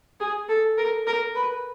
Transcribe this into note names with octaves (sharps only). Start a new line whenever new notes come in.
G#4
A4
A#4
A#4
B4